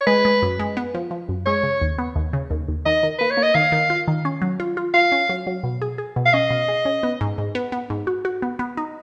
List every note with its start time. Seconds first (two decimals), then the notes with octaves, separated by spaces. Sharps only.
0.01 C#5
0.07 G#3 B4
0.25 G#3
0.42 F#2
0.59 G#3
0.77 B3
0.95 F3
1.11 F3
1.29 F#2
1.46 G#3 C#5
1.63 C#3
1.81 D#2
1.98 B3
2.16 D#2
2.33 C#3
2.51 D#2
2.68 D#2
2.86 D#3 D#5
3.03 D#3
3.19 A#3 B4
3.31 C#5
3.37 A#3
3.43 D#5
3.55 D#3 F5
3.72 D#3
3.90 F4
4.08 D#3
4.25 C#4
4.42 F#3
4.60 F4
4.77 F4
4.94 F4 F5
5.12 C#4
5.29 F#3
5.47 F#3
5.64 B2
5.82 G#4
5.98 G#4
6.16 B2
6.26 F5
6.34 C#4 D#5
6.50 B2
6.68 G#4
6.85 C#4
7.03 B3
7.21 G#2
7.38 G#2
7.55 B3
7.72 B3
7.90 G#2
8.07 F#4
8.25 F#4
8.42 B3
8.59 B3
8.77 D#4